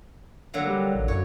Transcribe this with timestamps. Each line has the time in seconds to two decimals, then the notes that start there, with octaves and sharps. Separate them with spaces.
0.54 D3 F#3 A#3
0.67 G3
0.95 A1
1.08 F#2 C#5